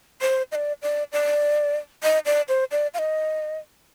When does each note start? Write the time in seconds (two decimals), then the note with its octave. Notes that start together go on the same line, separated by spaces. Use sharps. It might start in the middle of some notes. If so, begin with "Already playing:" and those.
0.21 C5
0.52 D#5
0.55 D5
0.82 D5
1.12 D5
2.03 D#5
2.26 D5
2.49 C5
2.71 D5
2.94 F5
2.99 D#5